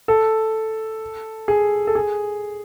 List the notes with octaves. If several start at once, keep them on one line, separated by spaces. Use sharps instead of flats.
A4
G#4
A4
G#4